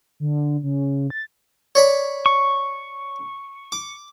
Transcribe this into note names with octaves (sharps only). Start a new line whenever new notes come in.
D3
C#3
A6
C#5 D5 B5
C#6
D6